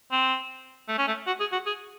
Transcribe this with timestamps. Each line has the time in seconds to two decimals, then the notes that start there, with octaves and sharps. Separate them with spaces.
0.12 C4
0.89 A3
0.98 C#4
1.08 A3
1.27 F#4
1.40 G#4
1.52 F#4
1.66 G#4